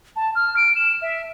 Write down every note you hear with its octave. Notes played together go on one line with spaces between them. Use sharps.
A5
F6
D7
E7
E5